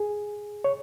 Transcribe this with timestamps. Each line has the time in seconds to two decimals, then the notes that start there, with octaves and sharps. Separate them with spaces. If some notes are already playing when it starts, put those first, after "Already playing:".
Already playing: G#4
0.64 C#5